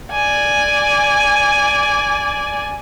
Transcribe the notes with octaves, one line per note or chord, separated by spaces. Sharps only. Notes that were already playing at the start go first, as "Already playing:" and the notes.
D5 G#5